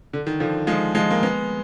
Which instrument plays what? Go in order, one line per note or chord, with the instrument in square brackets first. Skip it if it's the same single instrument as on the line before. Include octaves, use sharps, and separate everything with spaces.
[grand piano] D3
D#3
D3 F3
F3 G#3
F3 G#3
A#3
G#3 B3